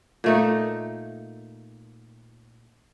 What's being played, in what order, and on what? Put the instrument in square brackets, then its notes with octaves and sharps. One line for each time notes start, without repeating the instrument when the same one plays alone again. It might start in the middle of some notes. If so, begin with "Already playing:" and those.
[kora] A#2 A3 D#4